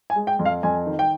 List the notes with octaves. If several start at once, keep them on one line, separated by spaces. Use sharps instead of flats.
G#5
G#3
G5
F2
F5
F2 G#5
D#3
G5